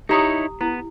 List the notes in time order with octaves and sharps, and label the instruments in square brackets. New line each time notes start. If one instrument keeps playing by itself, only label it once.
[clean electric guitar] D#4 E4 C#5 [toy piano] G4 A#5 D#6
[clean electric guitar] B3 [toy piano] E4